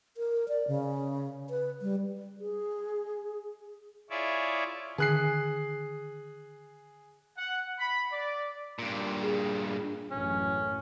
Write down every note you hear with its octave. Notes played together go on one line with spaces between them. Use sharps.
A#4
D5
C#3
B4
G3
G#4
E4 F4 G#4 C#5 D5 E5
D3 D#3 G#4 F#6 C7
F#5
B5
D5
G2 A#2
G#4
D4
A1 F#2 C#4